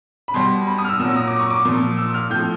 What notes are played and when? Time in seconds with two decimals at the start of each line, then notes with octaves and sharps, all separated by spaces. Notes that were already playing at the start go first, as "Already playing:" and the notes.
0.28 B5
0.34 B2 G3 C6
0.67 B5
0.78 D#6
0.85 F6
0.89 E6
1.00 A#2 E6
1.04 F#3
1.16 D#6
1.28 D6
1.40 C#6
1.50 D6
1.65 A#2 F3
1.97 E6
2.14 F6
2.30 A2 G6
2.35 F3